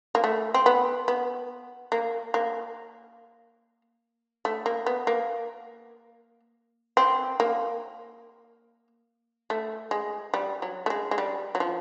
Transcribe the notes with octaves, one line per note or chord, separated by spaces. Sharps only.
A#3
A3
C4
B3
B3
A#3
A#3
A3
A#3
B3
A#3
C4
A#3
A3
G#3
G3
F#3
A3
G#3
G#3
G3
F#3
F3